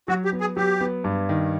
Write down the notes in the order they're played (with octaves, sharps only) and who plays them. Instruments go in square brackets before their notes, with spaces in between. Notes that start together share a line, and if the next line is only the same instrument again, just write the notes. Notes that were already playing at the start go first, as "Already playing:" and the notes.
[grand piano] F#3 [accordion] F#4
[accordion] G4
[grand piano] B3
[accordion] G#4
[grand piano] F#3 [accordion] G4
[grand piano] B3
G2
D#3